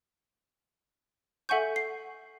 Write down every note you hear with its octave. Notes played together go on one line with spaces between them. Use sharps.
A4 E5 F#5 G#5 C#6 G6
C7